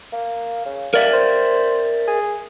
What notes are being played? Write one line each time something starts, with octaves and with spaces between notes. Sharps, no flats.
A#3
C#3
A#3 A#4 D5 E5
C5
G#4